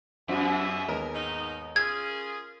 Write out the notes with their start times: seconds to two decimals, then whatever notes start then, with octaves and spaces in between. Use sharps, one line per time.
0.28 F#2 C4 F4 F#4 G#4 D#5 E5
0.88 D#2 G#3 B3 A#4
1.14 G#2 D#3 D#4
1.76 C#4 F4 G#4 E6 G#6